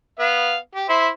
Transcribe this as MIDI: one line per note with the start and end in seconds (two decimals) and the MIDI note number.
0.19 0.57 59
0.19 0.57 77
0.75 0.87 67
0.89 1.09 64
0.89 1.09 72
0.89 1.09 76